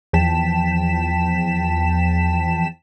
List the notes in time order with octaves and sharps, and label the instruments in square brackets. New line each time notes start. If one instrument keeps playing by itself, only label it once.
[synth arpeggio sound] E2 F3 G5 A5 B6 E7